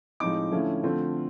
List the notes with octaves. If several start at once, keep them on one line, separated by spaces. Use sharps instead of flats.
A2 F3 G#3 C4 D#4 D6
D3 F3 A3 C#4 E4
D3 F3 A3 C4 F4